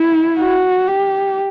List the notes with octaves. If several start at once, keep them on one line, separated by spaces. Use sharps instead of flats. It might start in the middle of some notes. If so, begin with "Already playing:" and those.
Already playing: E4
F#4
G4